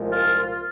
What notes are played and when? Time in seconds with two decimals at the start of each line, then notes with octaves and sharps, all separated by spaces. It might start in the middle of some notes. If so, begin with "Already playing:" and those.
Already playing: C2 A#2 F3 G#3
0.12 F4
0.39 F4